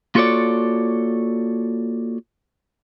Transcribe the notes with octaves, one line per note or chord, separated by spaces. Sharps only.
A#3 F4 F#4 A4 C#5 D5